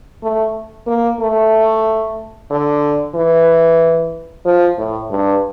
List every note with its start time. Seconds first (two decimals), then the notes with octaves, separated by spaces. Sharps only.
0.23 A3
0.87 A#3
1.20 A3
2.51 D3
3.15 E3
4.45 F3
4.78 A2
5.11 G2